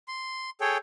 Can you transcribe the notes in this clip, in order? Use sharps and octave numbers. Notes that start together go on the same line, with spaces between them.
C6
G#4 A4 C#5 G5